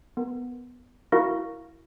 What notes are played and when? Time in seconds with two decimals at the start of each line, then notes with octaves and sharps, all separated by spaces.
0.17 B3 A#4
1.12 E4 F#4 A#4 F5 C#6 A#6